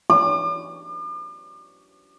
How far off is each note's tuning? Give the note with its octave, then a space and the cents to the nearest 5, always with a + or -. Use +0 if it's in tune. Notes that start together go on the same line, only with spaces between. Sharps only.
D6 +45